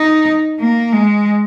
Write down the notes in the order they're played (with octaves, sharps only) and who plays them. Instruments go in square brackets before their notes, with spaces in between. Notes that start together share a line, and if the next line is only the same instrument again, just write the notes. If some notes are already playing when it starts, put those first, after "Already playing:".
Already playing: [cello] D#4
A#3
G#3